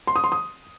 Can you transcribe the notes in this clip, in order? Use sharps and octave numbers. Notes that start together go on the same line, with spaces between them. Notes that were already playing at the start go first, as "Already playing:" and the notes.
C6
D#6
C6
D#6